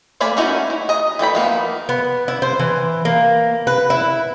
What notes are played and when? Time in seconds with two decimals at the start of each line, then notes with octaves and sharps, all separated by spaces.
0.21 A3 A#3 D5 G#5 B5
0.37 A3 C#4 D#4 E4 F#4
0.70 E4
0.89 D#5 A#5
1.19 E3 A4 G5 B5
1.35 F3 A#3 B3 D#4
1.89 B3
2.28 E4
2.42 C5
2.60 E3
3.05 A#3
3.67 B4
3.90 E4